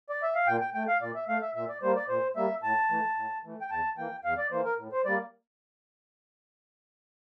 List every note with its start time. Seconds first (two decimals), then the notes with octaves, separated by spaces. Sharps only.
0.10 D5
0.23 E5
0.35 F5
0.47 A#2 G5
0.61 G5
0.74 A3 G5
0.88 F5
1.02 A#2 D5
1.15 E5
1.28 A3 F5
1.42 E5
1.55 A#2 E5
1.69 D5
1.82 G3 A#3 C5
1.96 D5
2.09 A#2 C5
2.36 G3 A#3 E5
2.63 A2 A5
2.90 E3 A3
3.17 A2
3.44 E3 A3
3.61 G5
3.71 E2 A5
3.97 E3 A#3 G5
4.24 E2 F5
4.38 D5
4.51 E3 A#3 C5
4.65 A#4
4.78 A2
4.92 C5
5.05 G3 A#3 D5